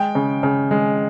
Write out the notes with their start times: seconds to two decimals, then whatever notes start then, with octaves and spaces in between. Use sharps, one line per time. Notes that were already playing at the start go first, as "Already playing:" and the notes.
Already playing: G#3 G5
0.15 C#3
0.43 C#3
0.71 G#3